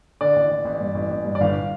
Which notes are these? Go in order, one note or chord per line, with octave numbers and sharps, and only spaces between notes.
D3 D5
A1
A1
A1
G2
A1
A1
G2
D5
G1 F5